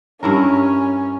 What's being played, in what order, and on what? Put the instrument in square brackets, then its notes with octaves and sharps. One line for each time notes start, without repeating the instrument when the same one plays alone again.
[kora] G2 E4 A#4 [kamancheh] C#4